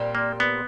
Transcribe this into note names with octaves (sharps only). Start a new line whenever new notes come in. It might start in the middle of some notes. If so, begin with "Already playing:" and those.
Already playing: A#2 G3 C4
A#3
B3